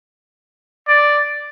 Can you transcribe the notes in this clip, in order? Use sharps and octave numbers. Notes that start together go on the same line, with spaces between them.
D5